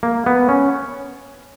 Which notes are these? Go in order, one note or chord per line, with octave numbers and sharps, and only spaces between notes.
A#3
B3
C#4